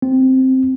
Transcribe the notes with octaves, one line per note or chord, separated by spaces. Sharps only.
C4